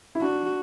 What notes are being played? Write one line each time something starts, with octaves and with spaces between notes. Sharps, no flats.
E4
D4 F#4